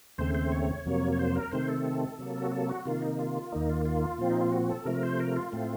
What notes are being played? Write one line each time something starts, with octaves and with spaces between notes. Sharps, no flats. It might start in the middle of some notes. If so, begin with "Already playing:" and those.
D#2 C#3 A3 C4 C5
C5
C#5
F2 C3 F#3 A#3
C#5
C5
A#4
C3 D#3 A3 C4 C5
A4
C3 F#3 A#3
F#4
A4
F#4
C3 D#3 A#3 F4
D#4
F4
D#2 D#3 A#3 D#4
F4
F4
A#2 F3 C4
D#4
F4
F#4
A4
C3 F3 A3 A#4
C5
A#4
F4
A2 A3 C4